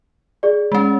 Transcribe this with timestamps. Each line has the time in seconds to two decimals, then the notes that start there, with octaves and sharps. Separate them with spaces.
0.43 G#4 D5
0.72 G#3 C#4